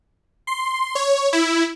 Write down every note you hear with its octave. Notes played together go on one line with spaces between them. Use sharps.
C6
C#5
E4